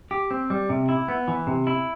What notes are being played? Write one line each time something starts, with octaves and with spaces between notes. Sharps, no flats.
G4
C4
G3
C3
E4
B3
E3
C3
E4